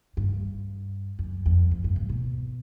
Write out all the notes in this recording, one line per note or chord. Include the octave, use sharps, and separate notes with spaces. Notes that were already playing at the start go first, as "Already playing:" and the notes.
G2
F#2
F2
F#2
G2
G#2
B2